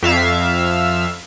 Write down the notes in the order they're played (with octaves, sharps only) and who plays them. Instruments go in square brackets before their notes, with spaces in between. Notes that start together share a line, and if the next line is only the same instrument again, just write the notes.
[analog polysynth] F2 E5 F5